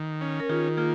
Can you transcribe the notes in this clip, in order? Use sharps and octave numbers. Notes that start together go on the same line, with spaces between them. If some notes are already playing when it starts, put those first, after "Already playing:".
Already playing: D#3
C#4
A#4
D#3 F4 G#4
A#3 F4 G#4